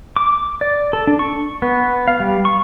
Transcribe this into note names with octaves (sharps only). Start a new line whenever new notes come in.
D6
D5
A4
D4
C#6
B3
F5
G3
C#6